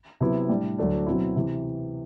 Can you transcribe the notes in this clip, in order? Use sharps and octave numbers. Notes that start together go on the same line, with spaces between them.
C3 F#3 B3 E4
A2 G3 D4
D2 D3 F#3 A3 D4
B2 F#3 C4 E4
C3 E3